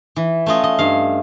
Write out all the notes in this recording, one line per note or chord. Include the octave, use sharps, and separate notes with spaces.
E3
A3 C#4 F4 D#5
D#5
G2 F5